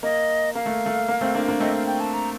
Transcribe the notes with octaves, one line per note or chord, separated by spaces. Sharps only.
A#3 D#5
A#3 F5
A3
A3
A#3
A3 C4
A#3 D4
A#3 D4
A3 C4 D#5
F5
G5
A5
A#5